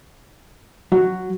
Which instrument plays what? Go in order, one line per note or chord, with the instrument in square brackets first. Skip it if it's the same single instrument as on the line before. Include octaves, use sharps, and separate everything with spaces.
[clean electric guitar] F#3 [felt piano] F#4